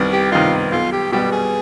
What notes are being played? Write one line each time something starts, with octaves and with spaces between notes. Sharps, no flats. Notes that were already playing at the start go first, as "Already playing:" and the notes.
Already playing: C2 D#3 B3 D#4
G4
C3 D#3 B3 D#4 F4
B1 F4
G4
B2 G3 B3 G4
G#4